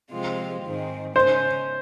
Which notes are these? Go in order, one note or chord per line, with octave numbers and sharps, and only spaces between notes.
C3 F3 G#3 C4 F4
G#2 D#3 G#3 C4
C#3 G#3 C#4 C5